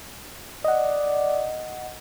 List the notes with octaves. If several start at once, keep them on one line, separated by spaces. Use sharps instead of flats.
D5 D#5 F#5